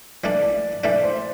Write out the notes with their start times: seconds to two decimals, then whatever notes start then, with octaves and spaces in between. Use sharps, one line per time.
0.23 E3 A3 D4 D5
0.83 E3 A3 D4 D5
1.04 C5